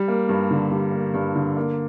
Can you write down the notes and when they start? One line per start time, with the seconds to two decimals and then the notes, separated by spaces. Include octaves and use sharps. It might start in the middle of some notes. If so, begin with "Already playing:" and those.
Already playing: G3
0.08 A#3
0.29 G2
0.50 D3
0.71 G3
0.92 A#3
1.14 G2
1.35 D3
1.57 A#3